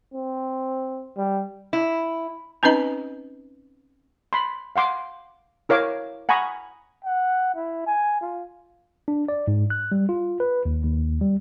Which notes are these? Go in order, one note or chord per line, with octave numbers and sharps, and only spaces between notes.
C4
G3
E4
C4 C#4 D#4 B4 D#5 A#5
B5 C6
F5 F#5 C6 D6
E4 A#4 C#5 F5 D6
F#5 G#5 A#5 B5 C#6 D#6
F#5
E4
G#5
F4
D4
D5
G#2
F#6
G3
F4
B4
D#2
D#2
G3